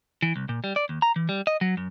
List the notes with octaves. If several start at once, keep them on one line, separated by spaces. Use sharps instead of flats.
E3
C2
A#2
G3
D5
D#2
A#5
E3
G3
D#5
F#3
F#2